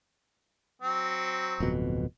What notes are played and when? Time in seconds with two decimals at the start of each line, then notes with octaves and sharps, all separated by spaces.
0.82 F#3 C4
1.60 D1 F2 B2